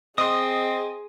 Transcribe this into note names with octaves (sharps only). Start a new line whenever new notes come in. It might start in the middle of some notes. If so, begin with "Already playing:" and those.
C4 G#4 D#5 C6 D#6